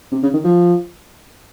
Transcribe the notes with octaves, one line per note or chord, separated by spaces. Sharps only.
C3
C#3
D#3
F3